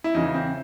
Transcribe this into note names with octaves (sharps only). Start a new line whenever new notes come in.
E4
E2 C#3 E3 D#4
C4